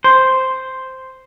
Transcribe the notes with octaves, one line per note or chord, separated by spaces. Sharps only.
C5